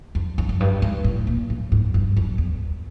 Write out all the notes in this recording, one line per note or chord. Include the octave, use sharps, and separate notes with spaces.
F2
F#2
F#2
G2
G#2
A2
A#2
A2
G#2
G2
F#2
E2